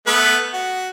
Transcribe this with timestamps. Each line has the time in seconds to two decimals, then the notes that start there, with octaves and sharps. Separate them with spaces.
0.07 A3 B3 B4
0.53 F#4